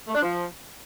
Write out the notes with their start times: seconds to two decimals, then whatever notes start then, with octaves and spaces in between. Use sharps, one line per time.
0.08 A3
0.15 D4
0.22 F3